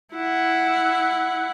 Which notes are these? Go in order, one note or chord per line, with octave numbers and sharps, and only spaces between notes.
E4 F#5